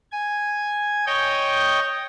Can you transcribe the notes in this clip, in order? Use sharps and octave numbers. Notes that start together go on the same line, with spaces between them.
G#5
C#5 D#5 G5